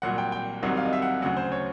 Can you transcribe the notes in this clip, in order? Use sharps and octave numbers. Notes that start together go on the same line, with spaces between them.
C2 A#2 F#3 F#5
G5
G5
C2 C3 D#3 F#3 F#5
F5
D#5
E5
F#5
D2 C#3 F#3 F#5
C5
C#5